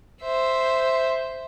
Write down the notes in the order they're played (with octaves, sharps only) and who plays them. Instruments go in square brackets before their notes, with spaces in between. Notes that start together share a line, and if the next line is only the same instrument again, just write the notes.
[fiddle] C5 E5